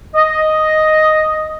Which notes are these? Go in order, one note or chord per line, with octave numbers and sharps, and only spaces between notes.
D#5